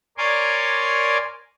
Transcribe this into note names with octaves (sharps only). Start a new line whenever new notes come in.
A#4 C#5 D5 G#5 C6 D6